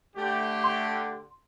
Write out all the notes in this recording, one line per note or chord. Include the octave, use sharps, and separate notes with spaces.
D3 A3 G4
C6